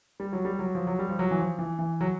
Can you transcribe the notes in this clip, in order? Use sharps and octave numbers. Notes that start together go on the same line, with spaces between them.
G3
F#3
G3
F#3
F3
F#3
G3
F3
F#3
E3
F3
E3
E3
F#3